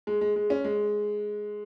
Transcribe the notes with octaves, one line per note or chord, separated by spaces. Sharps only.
G#3
G#3
G#3
C#4
G#3